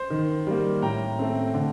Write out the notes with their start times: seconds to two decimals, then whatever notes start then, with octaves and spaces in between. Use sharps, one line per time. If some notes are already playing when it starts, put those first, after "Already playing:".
Already playing: C5
0.10 D#3
0.47 G3 A#3
0.82 A2 G5 A#5
1.19 A3 C4
1.54 D3